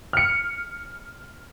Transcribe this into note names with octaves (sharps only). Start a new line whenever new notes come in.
F6 C#7